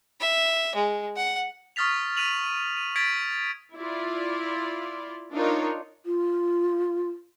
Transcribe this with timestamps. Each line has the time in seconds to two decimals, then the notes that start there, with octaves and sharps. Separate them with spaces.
0.21 E5
0.75 G#3
1.16 F#5
1.76 C#6 D#6 F6 A6 B6 F7
2.17 F6 B6 D#7 F7 F#7
2.77 D#7
2.96 G#6 A6 B6 D7
3.75 E4 F4 D5
5.32 D4 D#4 F4 A#4 C#5
6.06 F4